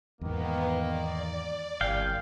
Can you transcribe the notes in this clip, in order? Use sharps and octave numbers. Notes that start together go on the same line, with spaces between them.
E2 G#2 D#3 A#3 B3
D5
G1 C2 F5 G5 G#5